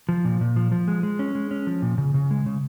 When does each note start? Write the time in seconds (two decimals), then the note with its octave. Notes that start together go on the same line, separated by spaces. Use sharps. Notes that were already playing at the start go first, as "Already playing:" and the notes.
0.09 F3
0.25 A#2
0.41 A#2
0.56 F3
0.72 F3
0.88 G#3
1.03 G#3
1.19 C#4
1.35 G#3
1.51 C#4
1.67 F3
1.82 A#2
1.98 C#3
2.14 C#3
2.31 G#3
2.46 C#3